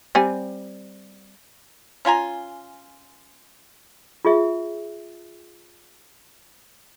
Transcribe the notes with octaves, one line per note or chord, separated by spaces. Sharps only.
G3 C4 G#5
C#4 F4 G#5 A#5
F4 G#4 E5